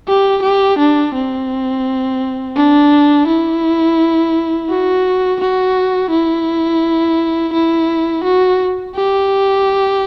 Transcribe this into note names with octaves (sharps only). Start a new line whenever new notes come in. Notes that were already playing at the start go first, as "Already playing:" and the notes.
G4
G4
D4
C4
D4
E4
F#4
F#4
E4
E4
F#4
G4